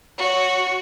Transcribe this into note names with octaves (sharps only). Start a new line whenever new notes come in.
F#4 C#5